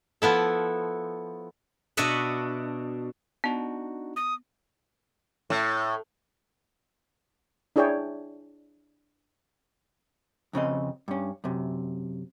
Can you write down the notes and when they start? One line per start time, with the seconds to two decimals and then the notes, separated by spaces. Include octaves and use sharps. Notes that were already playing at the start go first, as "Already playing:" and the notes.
0.22 F3 B3 E4 A4
1.97 B2 D4 F#4 D#5 E5 F#5
3.44 B3 D4 D#4 F#4
4.16 D#6
5.50 A2
7.76 D4 E4 G#4 C#5 D5 G5
10.53 F2 C#3 C4 D#5
11.08 G2 C#4
11.44 F#2 C3